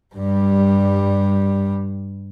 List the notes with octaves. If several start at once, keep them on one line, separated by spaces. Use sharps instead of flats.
G2 G3